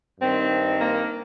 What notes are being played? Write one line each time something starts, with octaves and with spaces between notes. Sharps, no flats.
G2 D#3 C4
A#3